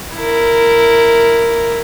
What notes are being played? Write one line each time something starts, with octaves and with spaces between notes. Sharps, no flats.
E4 A#4